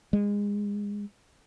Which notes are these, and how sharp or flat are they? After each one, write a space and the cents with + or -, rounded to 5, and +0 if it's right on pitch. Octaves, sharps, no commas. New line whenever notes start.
G#3 -25